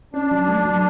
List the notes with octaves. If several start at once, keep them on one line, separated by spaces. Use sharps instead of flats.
C#4 D4
F#3
A3
F#3